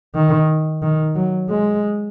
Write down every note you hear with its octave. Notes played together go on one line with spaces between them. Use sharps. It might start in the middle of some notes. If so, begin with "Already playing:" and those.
D#3
D#3
F#3
G#3